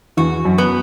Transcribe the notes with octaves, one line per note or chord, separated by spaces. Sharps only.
E2 E3 F#4
F#2 F#3
B3